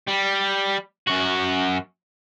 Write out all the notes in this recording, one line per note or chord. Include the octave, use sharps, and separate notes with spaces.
G3
F#2 F#4